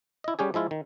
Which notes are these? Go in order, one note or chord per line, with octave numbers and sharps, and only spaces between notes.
E4 D#5
G3 C#4 G4 G#4
F3 G#3 E4 F4
D#3